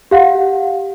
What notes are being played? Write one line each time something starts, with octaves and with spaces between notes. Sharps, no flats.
G4 F5 F#5